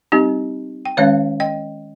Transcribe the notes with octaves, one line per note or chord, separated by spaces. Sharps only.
G3 C4 D#4 G4
G5
D#3 G#3 C#4 C#5 F5
D#5 G5